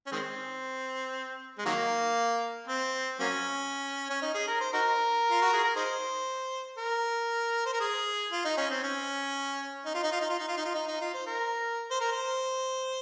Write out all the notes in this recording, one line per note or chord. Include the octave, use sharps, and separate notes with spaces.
C#4
D#3 G#3 C4
G#3
D#3 F#3 A#3
C4
F#3 A#3 C#4
C#4
D#4
G#4
A#4
C5
D#4 F#4 A#4
F4
F#4
G#4
A#4
D#4 G#4 C5
A#4
C5
A#4
G#4
F4
D#4
C#4
C4
C#4
D#4
F4
D#4
F4
D#4
F4
D#4
F4
D#4
F4
D#4
D#4
F4
C5
A#4
C5
A#4
C5